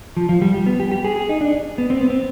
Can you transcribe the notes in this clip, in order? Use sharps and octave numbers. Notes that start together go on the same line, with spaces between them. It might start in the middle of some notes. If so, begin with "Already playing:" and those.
F3
F3
G3
G3
B3
G4
G4
G#4
G#4
D#4
D4
B3
C4
B3
C4